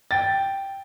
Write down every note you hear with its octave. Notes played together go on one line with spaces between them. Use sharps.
G5 A6